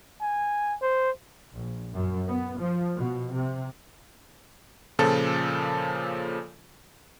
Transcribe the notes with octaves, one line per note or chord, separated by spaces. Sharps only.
G#5
C5
A#1
F#2
B3
F3
B2
C3
A#2 C#3 F3 A4